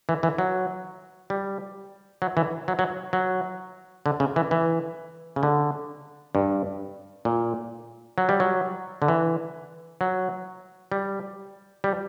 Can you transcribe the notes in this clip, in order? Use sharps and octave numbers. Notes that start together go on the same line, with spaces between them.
E3
E3
F#3
G3
F#3
E3
F#3
F#3
F#3
D3
C#3
E3
E3
C#3
D3
G2
A#2
F#3
G3
F#3
D3
E3
F#3
G3
G3